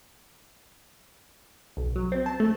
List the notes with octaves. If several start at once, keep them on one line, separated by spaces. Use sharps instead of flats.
B1
F#3
C4
A5
A3